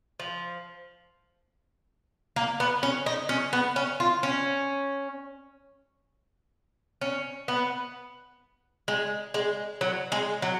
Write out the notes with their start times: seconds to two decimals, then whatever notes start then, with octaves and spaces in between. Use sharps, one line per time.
0.20 F3
2.36 A#3
2.60 B3
2.83 C#4
3.06 D#4
3.29 C#4
3.53 B3
3.76 C#4
4.00 F4
4.23 C#4
7.01 C#4
7.48 B3
8.88 G#3
9.34 G#3
9.81 F#3
10.12 G#3
10.42 F#3